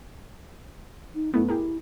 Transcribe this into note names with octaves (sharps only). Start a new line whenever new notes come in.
D#4
F#2 A3 B3 E4
E4 G4 G#4 A#4